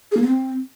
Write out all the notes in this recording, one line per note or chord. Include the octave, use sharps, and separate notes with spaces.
G#4
A#3
B3
C4